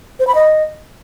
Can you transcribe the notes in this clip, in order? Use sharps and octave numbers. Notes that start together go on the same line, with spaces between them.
C5
B5
D#5